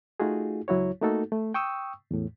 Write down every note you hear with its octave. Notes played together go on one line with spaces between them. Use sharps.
A3 D#4 F4 F#4 G#4
C#2 F#3 E4 F#4 C#5
A3 A#3 D#4 F#4 A4
A3
G5 C#6 D#6 E6
E2 A2